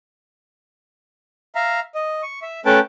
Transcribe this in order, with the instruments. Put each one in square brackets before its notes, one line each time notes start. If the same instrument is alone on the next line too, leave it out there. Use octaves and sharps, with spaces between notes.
[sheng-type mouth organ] E5 F5 A#5
D#5
C#6
E5
A3 C#4 B4 G5 A5